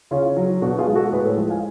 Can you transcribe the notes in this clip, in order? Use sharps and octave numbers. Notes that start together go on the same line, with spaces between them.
C#3 C#4 F4
F#3
B2 D4 F#4
F4 G#4
G#3
F#4 A4
A2 G#4 B4
A4 C#5
F3 G#3
F5 G#5